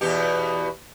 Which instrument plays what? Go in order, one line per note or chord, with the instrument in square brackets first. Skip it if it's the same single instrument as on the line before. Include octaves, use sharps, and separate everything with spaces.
[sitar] E2 B2 G4